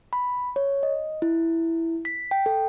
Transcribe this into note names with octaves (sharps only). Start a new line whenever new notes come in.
B5
C#5
D#5
E4
B6
G5
A4